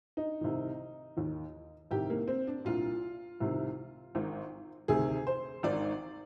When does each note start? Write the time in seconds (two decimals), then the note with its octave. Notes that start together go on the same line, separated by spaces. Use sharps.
0.17 D#4
0.41 C2 C3 D#3
1.17 D#2 D#3
1.91 C2 C3 D#3 G4
2.10 A#3
2.28 C4
2.47 D4
2.65 C2 A#2 F4
3.40 C2 C3 D#3
4.15 G#1 G#2 D#3
4.88 D2 C3 D#3 G#4
5.27 C5
5.63 G#1 G#2 D#3 D5